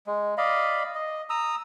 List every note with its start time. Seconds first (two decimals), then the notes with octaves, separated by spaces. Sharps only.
0.07 G#3
0.38 D5 D#5 F5 B5
0.95 D#5
1.30 A#5 D#6 E6